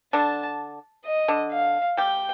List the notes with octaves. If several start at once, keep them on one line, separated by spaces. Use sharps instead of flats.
D3 D4 A5
D#5
D3 D4
F5
G3 G4 G5